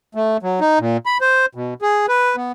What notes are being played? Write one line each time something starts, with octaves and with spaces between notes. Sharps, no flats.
A3
F#3
D#4
A#2
B5
C5
B2
G#4
B4
B3